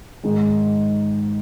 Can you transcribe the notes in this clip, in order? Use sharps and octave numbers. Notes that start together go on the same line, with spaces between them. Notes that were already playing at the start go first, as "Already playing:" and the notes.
G#2 D#3 G#3